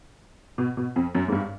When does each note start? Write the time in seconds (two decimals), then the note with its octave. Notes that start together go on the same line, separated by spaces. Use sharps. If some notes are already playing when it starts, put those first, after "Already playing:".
0.58 B2
0.77 B2
0.96 F2
1.15 F#2
1.28 G#2
1.32 G2